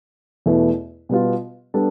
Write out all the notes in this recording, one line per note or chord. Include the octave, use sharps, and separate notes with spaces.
E2 B2 A3 E4 B4
B2 G3 B3 F4
G3 B3 D4 A4